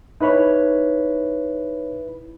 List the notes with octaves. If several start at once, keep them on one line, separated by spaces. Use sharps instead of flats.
D#4 E4 B4 C#5 B5